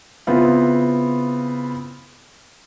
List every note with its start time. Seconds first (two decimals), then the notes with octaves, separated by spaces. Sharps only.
0.27 C#3 B3 C4 E4 F4